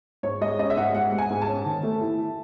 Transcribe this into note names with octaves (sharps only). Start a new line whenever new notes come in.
G#2 C#5
G#3 D#5
C#4 D#5
E5
G#2 F#5
G#3 F#5
G#3
G#5
G#2
A5
C#4
D#3
A3
E4